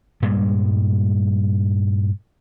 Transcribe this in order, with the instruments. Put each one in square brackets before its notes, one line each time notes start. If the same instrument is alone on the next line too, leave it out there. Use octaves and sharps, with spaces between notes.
[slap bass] G2 A#2 G3 G#3